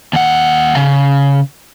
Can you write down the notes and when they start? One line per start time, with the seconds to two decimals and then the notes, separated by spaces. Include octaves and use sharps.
0.13 D#2 F#5
0.76 C#3